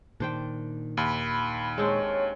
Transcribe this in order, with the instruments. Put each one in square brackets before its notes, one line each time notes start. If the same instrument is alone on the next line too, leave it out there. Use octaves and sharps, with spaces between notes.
[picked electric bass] A#2 D#3 [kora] D4 C5 G5
[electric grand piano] D#2 [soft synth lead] B5
[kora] G#3 C4 D4 [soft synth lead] C#5